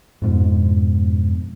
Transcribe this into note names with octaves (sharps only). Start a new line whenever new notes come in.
F2 G#2 B2